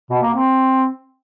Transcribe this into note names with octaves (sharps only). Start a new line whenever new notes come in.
B2
A#3
C4